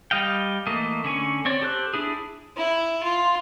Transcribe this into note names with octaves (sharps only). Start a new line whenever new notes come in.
G3 D#5 F5 G5
E3 A3 A#3 D#5
D3 C#4 G#5 C#6
C4 C#5 D5
G4 A4 C5 F#6
D4 E4 G#4
E4
F4